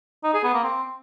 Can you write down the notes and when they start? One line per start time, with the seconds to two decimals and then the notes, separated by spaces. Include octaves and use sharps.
0.24 D#4
0.34 G#4
0.44 B3
0.54 A#3
0.64 C4